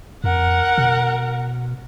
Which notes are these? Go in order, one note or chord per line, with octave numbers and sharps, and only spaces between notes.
F2 A#4 F#5
B2